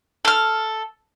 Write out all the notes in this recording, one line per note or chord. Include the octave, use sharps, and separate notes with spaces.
A4 F6